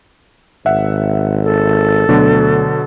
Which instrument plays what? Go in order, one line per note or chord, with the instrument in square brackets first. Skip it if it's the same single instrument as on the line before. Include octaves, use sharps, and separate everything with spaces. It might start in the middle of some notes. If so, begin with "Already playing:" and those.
[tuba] G#1 [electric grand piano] E5 F#5
[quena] A4
[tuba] D2 [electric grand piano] B2 D3 F#3